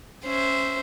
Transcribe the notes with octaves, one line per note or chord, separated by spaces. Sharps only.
C#4 C5 E5